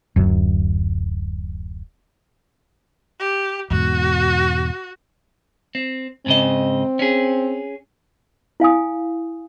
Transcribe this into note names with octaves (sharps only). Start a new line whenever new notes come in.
D1 F#2
G4
E2 G#2 B2 F#4
C4
G#2 C#3 C4 D#5
C#4 G#4
E4 F5 G#5 D#6